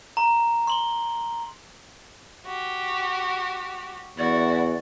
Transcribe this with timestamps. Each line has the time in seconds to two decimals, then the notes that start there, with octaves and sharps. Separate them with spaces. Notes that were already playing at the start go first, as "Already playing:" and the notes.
0.17 A#5
0.67 C6 F#7 G7
2.45 F#4 G4
4.18 E2 E4 F#4 D5